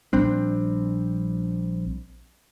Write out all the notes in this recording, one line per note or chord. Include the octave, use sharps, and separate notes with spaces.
A#1 G3 C4 D4